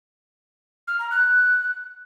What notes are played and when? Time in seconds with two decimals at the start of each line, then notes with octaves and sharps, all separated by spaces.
0.88 F6
0.99 A#5
1.11 F#6